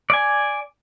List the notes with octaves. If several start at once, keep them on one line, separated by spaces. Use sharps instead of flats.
D5 G#5